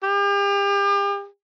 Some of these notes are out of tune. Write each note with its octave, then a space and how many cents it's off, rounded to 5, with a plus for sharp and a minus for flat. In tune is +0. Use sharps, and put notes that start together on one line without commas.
G4 +40